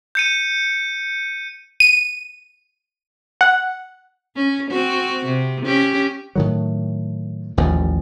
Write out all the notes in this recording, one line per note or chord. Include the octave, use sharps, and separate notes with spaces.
G6 C#7 D#7
D#7
F#5
C#4
C4 F#4
C3
C#4 G4
A2 D#3 F#3
A1 D#2 A#2 F3